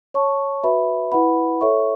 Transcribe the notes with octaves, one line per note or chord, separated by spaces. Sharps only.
C#5 A5 C#6
F#4 B4 E5 B5
E4 B4 F#5 B5
A4 C#5 E5 C#6